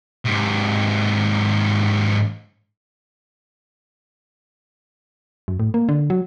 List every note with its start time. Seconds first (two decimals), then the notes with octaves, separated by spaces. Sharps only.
0.25 G#2 C3
5.48 F#2
5.60 A2
5.74 A#3
5.89 D3
6.10 F#3